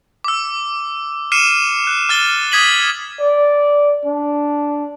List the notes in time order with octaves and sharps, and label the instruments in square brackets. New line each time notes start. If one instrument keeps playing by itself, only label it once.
[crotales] D6 E6
D6 F6 C7 C#7 D#7 E7
F#6
F6 A6 G7
D#6 G#6 B6 D#7 F#7
[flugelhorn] D5
D4